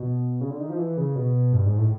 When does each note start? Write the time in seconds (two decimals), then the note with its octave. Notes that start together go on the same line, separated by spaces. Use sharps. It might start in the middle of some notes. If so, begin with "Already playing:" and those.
Already playing: B2
0.41 C#3
0.50 D3
0.60 D#3
0.70 F3
0.79 E3
0.97 C#3
1.15 B2
1.53 G2
1.66 G#2
1.78 A2